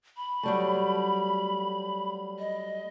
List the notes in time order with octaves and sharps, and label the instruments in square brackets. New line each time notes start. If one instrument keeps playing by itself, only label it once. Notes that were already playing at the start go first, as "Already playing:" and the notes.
[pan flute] B5
[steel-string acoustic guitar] F#3 G3 A3
[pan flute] D#5